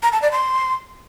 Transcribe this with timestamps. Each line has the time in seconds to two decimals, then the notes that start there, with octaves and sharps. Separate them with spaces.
0.03 A#5
0.12 A5
0.22 D5
0.32 C6